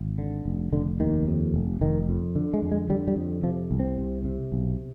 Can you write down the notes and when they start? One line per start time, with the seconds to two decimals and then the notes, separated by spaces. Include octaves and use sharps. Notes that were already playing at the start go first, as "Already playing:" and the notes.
Already playing: G#1
0.18 D3
0.45 F1
0.73 F1 D3
1.00 D#2 D#3
1.27 F2
1.54 F1
1.81 F1 D#3
2.09 F2
2.36 D3
2.54 G#3
2.62 F2
2.72 G#3
2.89 D3 G3
3.08 G3
3.16 F2
3.43 C3 F3
3.71 C2
3.80 C4
3.98 C3
4.25 C3
4.52 B1